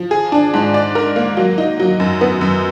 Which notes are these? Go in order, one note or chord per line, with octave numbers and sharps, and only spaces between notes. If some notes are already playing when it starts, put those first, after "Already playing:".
Already playing: F3
G#4
D4
G#2
D5
A#4
A#3
F#3
D#4
F#3
F#2
B3
F#2